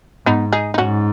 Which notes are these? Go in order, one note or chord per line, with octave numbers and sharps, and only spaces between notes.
G#2 B3 D#4
D#4 G#4
D#4
G#2 C#4 F#4